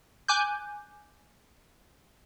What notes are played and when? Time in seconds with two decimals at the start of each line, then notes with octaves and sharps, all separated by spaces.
0.28 G#5 D6 F#6 G6